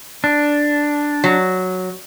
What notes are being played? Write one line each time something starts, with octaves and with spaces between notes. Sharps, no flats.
D4
F#3